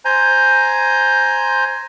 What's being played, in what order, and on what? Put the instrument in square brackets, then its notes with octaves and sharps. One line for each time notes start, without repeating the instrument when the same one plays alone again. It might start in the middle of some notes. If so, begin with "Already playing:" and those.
[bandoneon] C5 G#5 A#5 G6